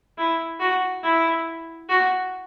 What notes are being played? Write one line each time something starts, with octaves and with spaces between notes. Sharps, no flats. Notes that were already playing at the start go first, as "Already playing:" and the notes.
E4
F#4
E4
F#4